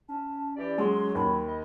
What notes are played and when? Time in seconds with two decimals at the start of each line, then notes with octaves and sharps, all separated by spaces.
0.09 C#4 A5
0.57 E3 G4 D5
0.78 F#3 G#3 C6
1.15 D#2 B5
1.48 D#5